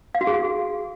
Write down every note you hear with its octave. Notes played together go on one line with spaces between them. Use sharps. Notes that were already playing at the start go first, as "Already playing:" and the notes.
F5
F#4
G#4